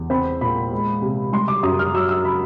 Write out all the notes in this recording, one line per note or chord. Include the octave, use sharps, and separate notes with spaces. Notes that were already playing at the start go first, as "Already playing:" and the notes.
Already playing: E2
C4 B5
A#2 B5
G#3
C3
G3 C6
D6
F#2 D#6
F6
F#3 E6
E6
B5